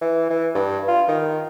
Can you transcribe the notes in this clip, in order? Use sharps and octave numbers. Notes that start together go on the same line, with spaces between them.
E3
E3
G2
F4
D#3